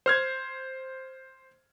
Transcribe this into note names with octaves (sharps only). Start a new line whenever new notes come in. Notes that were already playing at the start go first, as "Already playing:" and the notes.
C5 F6 G#6